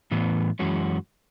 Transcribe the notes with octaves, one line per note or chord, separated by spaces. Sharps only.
A2 E3 B3
F#2 E3 G#3 C#4 F#4